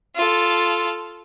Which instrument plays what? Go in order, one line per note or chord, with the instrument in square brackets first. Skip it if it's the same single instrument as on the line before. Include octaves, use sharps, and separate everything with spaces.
[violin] F4 A4